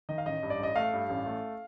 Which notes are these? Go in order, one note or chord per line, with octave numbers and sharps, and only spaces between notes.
D#3 D#5
F5
A1 D#5
G2
D5
A1 D#5
A3 F5
G2
A1
A3